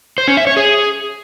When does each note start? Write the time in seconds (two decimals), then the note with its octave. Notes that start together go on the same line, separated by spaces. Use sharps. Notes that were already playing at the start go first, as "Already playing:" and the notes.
0.18 C5
0.28 C#4
0.37 E5
0.47 C#5
0.57 G#4